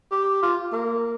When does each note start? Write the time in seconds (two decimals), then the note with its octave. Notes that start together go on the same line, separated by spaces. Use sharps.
0.11 G4
0.43 F4
0.73 A#3